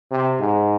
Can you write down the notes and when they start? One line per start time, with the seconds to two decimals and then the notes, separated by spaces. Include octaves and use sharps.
0.11 C3
0.40 G#2